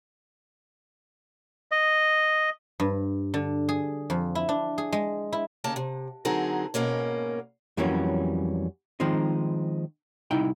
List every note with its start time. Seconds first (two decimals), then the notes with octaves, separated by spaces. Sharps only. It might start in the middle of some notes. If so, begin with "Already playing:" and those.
1.71 D#5
2.80 G2
3.34 D3
3.69 G#4
4.10 F2
4.35 E4
4.49 D4
4.78 G#4
4.92 G#3
5.33 E4
5.64 D#2 C#3 A#3 G5 A5
5.76 C3
6.25 D3 F#3 C4 D#4 G#4 A#4
6.74 G#2 B2 A#3 C#4
7.77 F2 E3 F#3 G3 A#3 C#4
9.00 D#3 F3 G#3 C4 D#4
10.31 C2 D#4 E4 G5